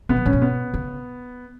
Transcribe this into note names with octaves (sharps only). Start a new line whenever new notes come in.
B2 B3
F#2
G#2 C#4
B2
B3
C#3